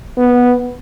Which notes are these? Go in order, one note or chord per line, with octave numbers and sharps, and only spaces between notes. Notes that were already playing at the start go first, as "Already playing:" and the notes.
B3